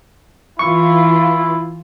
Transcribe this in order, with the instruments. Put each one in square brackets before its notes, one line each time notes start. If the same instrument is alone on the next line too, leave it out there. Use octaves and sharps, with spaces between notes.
[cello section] E3 F4 [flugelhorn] E4 [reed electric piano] C#6